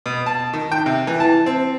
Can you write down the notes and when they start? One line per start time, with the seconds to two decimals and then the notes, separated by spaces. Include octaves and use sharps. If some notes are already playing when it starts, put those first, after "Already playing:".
0.06 B2
0.26 A5
0.53 D#3
0.72 G5
0.86 C3
1.07 E3
1.20 A5
1.46 C4